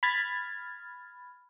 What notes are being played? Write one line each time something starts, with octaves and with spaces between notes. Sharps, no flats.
B5 F6 G#6 A6